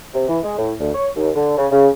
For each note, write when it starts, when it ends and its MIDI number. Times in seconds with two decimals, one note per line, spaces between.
0.14 0.28 48
0.28 0.38 52
0.43 0.55 56
0.58 0.73 45
0.80 0.90 38
0.95 1.09 73
1.16 1.30 39
1.36 1.55 50
1.58 1.67 49
1.72 1.89 49